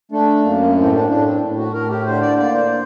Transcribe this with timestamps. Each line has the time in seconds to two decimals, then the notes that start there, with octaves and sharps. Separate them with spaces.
0.12 A3 D4
0.44 F#2 A#3
0.76 A2 C4
0.93 D4
1.08 A2 D4
1.25 C4
1.41 A2
1.58 F#4
1.73 A2 A#4
1.89 G4
2.06 D3 C5
2.22 D5
2.37 A#3 D5
2.54 C5